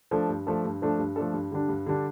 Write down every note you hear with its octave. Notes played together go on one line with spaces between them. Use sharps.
F3 A3 D4 A4
G2
F3 A3 D4 A4
G2
F3 A3 D4 A4
G2
F3 A3 D4 A4
G2
D3 G3 D4
G2
D3 G3 D4